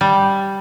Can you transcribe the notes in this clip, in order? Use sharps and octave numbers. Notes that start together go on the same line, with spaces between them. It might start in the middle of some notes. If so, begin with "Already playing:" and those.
G3